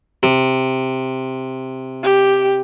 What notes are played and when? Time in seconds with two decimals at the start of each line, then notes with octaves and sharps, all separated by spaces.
0.23 C3
2.03 G4